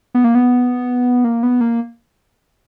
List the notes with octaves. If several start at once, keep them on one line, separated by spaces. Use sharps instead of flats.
B3
A#3
B3
A#3
B3
A#3